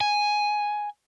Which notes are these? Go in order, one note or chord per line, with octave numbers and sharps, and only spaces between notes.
G#5